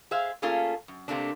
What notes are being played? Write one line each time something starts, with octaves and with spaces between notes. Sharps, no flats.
G#4 C5 E5 F5
A3 A#3 C#4 F4 G#4 A4
F#2
C3 A3 A#3 C4 D4